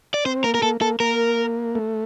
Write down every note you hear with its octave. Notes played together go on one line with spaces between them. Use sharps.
D5
C4 C5
A#3 A#4
A#4
A#3 A4
A#3 A4
A#3 A#4
A3